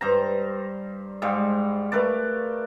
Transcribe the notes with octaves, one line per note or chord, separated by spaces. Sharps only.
G2 C5 A#5
G#2 G3 G#3 F5
A3 A#4 B4 D5